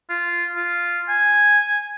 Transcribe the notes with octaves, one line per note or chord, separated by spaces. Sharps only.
F4
F4
G#5